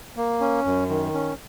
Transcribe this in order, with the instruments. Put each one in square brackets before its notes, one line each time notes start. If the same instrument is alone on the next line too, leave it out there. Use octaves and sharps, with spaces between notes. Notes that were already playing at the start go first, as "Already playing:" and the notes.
[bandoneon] A#3
C#4
F#2
D#3
C#4